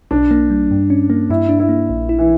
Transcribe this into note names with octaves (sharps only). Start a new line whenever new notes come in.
B1 D4
A#3
G3
G2
C#4
A#3
G2 E4
D4
E4
A#3
A#1
E4
E3